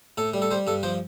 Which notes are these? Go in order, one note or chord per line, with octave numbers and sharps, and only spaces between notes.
A2 A4
G3
A4
G3 C5
G2 A4
F3 C5